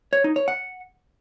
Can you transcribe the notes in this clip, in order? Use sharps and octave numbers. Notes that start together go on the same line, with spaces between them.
C#5
D#4
C#5
F#5